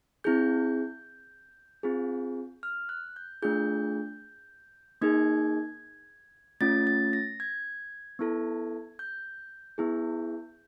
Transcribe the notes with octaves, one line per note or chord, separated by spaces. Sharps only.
C4 E4 G#4 G6
C4 F4 G#4
F6
F#6
G6
A3 D4 F4 G#4 G6
A#3 D#4 G#4 G#6
A3 C#4 F4 A6
A6
A#6
G#6
B3 E4 A4
G6
B3 E4 G#4